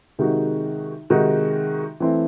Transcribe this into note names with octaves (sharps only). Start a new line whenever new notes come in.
C3 D#3 G#3 D#4 F#4
C3 D#3 G#3 D#4 F#4
E3 A3 C4 E4